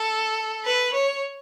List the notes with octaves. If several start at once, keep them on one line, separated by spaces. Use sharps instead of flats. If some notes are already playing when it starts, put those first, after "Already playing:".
Already playing: A4
B4
C#5